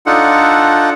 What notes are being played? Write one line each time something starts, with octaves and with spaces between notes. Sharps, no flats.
D4 D#4 F4 A4 F#5